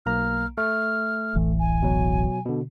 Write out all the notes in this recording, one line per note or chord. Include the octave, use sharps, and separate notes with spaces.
B1 A#3 A#5 F6
A3 F6
D1 A1 E3
G#5
B2 F#3
B2 D3